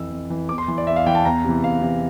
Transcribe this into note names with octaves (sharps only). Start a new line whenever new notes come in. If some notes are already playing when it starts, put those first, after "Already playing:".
Already playing: F2 E3 E6
F2
E3
E2 D6
C6
E3
D5
E2 E5
F5
E3 G5
A5
E2 A#5
C3 E3
E2 F5
C3 E3